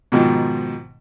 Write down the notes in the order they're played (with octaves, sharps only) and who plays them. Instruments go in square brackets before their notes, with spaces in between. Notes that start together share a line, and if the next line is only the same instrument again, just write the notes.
[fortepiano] G#2 B2 D#3 F3